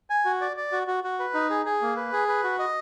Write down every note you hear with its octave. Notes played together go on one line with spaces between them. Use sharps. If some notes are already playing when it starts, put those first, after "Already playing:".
G#5
F#4
D5
D5
F#4
F#4
F#4
B4
D#4
G#4
G#4
A#3
B4
G#4
B4
F#4
D#5